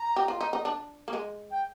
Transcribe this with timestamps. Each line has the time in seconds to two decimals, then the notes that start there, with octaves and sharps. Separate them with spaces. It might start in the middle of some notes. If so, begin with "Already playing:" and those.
Already playing: A#5
0.16 G4
0.28 F4
0.41 D#4
0.53 D#4
0.65 D4
1.08 A#3
1.13 G#3
1.51 G5